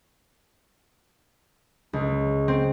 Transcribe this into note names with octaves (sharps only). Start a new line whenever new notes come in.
C#2
C4